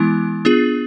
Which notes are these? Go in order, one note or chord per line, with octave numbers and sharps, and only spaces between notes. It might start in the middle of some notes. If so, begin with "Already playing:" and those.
Already playing: E3 G#3 B3 E4
B3 D4 F4 G#4